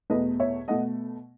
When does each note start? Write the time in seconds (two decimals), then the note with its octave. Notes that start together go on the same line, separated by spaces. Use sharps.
0.10 E2 B2 A3 B4 D#5
0.40 C#5 E5
0.68 B2 A3 D#5 F#5